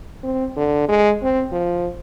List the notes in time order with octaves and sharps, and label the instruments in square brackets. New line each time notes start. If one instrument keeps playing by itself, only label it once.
[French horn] C4
D3
G#3
C4
F3